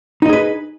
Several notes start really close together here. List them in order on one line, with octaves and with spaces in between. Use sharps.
D#4 D#5 G#4 B4